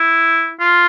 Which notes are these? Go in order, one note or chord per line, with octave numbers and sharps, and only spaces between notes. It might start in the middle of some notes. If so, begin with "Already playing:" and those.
Already playing: E4
F4